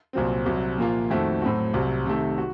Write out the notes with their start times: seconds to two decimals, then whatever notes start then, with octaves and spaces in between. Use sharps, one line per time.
0.13 C2 A#2 F#3 C4
0.46 C2 C3 F#3
0.78 A#2 F3 A#3 F4
1.10 F2 D#3 A3 C4 F#4
1.42 A2 F#3 C4 F#4
1.74 C2 C3 F#3
2.06 C3 D#3 A3
2.38 F#4